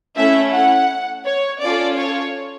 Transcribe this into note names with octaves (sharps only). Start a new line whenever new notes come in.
A3 C#4 E4 E5
F#5
C#5
C#4 F4 A4 D5
C#5